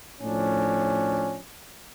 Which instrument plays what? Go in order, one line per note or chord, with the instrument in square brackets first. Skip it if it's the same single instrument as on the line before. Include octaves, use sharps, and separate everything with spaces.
[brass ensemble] A2 F3 C#4 D4